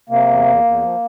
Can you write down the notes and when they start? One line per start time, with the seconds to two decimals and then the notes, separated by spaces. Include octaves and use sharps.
0.09 C3 A#3
0.28 E2
0.46 E2
0.64 E2
0.82 F3